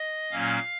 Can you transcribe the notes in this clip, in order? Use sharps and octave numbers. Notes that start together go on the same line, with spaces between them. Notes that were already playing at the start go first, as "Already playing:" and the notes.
Already playing: D#5
A#2 F#3 A#3 C#4 F5